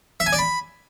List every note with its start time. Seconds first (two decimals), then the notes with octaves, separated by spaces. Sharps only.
0.20 E5
0.26 G#5
0.33 D5
0.39 B5